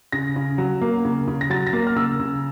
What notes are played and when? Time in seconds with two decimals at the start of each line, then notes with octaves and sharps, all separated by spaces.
0.12 C#3 A#6
0.36 C#3
0.58 F#3
0.81 A#3
1.05 C#3
1.28 C#3
1.41 A#6
1.50 F#3 A6
1.67 A#6
1.73 A#3 A6
1.87 F6
1.96 C#3 E6
2.19 C#3